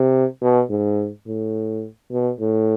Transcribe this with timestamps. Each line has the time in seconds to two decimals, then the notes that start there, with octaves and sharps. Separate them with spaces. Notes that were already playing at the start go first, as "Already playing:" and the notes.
Already playing: C3
0.42 B2
0.70 G#2
1.27 A2
2.11 B2
2.40 A2